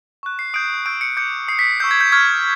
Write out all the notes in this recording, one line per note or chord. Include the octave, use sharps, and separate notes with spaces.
C#6 F#6
C7
D#6 G6 D7
C#6 E6 G6 D7
C#7
D6 G6 C#7
D#6 G6 C7
B6
C#6 E6 G6
G#6
G6
C#6 F6 G#6